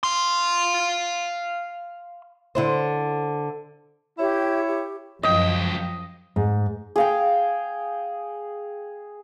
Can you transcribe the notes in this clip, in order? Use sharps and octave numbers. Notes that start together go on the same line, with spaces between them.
F5 C6
D3 E4 C5
E4 G4 C#5 E5 G#6
G4
C#2 F#2 F3 D#5 G5
G#2
G#4 F5 G5